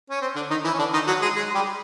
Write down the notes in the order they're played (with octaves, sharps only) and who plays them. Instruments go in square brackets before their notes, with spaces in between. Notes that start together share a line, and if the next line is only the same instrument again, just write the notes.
[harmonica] C#4
C4
D3 D4
D#3 D#4
E3 E4
C#4
D3 D4
D#3 D#4
F#3 F#4
G#3 G#4
G#3 G#4
G3 G4